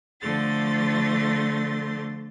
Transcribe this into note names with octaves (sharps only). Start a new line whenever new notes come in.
D3 F3 A3 C6 A6